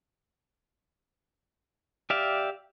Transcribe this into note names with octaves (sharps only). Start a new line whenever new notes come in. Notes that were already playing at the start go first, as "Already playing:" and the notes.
G4 D5 E5 F5